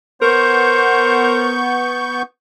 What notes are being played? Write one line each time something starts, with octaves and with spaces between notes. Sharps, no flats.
B3 A#4 C5 C#6 G6